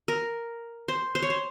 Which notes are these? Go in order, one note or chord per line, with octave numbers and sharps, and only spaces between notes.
A#4
C5
C5
C#5
C5